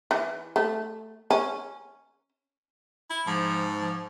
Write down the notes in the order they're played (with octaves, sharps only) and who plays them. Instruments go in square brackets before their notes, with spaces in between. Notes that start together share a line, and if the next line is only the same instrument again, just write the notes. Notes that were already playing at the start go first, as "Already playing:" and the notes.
[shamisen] E3
A3
C#4
[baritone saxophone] E4
[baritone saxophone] G#2 [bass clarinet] F3
[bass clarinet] F3